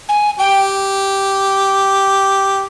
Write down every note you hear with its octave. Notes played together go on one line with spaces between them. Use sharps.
G#5
G4 G5